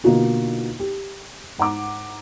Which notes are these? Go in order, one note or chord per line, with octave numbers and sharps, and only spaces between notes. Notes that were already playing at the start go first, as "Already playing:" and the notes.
B2 D3 A#3 D#4 F4 F#4
G4
G#2 F#5 A#5 D6